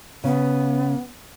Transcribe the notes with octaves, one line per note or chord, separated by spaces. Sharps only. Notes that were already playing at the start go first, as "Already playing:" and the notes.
C#3 B3